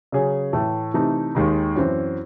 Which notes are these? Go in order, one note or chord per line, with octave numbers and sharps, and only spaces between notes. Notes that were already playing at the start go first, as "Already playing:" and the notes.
C#3 F#3 C#4 G#4
A2 E3 A3
C3 E3 A3 D#4
D#2 D#3 G#3 D#4
F#2 E3 C4